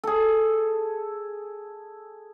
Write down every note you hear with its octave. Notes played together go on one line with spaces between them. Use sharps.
G#4 A4